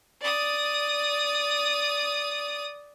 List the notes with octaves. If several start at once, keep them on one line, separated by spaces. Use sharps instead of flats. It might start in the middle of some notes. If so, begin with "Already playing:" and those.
D5 D#6